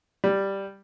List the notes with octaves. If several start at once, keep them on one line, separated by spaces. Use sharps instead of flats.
G3